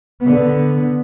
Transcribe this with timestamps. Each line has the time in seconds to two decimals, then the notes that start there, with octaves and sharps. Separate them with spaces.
0.22 D3 B3